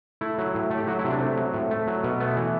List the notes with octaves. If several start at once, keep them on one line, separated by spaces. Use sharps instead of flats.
A3 E4
F#3
A2
A3
G4
F#3 F#4
E4
C3
D4
A3 C4
F#3
A2
A3
F#3
B2
A3 B3
E3